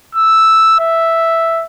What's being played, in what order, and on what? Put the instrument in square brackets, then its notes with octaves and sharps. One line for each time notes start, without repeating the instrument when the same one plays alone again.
[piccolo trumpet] E6
E5